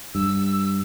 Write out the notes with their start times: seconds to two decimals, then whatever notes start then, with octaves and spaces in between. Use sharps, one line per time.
0.15 G2 E6